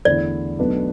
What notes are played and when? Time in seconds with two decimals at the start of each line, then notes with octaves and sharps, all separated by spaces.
0.05 E2 D3 A3 E4 D5
0.58 B1 B2 A3 D4 B4